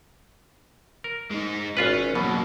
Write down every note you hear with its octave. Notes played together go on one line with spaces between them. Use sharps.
A#4
G#3 D#4
G#1 C#4 F4 B4
B2 F#3 A#3